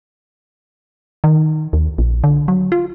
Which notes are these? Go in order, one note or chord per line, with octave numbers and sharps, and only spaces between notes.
D#3
D#2
A#1
D3
F#3
F4